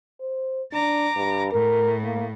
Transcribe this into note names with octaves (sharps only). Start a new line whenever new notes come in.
C5
D4 A#5 D6
G2
A2 A#4
A#3